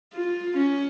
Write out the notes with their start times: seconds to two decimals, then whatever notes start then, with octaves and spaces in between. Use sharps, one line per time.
0.14 F4
0.57 C#4